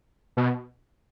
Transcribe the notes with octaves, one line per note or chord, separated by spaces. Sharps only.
B2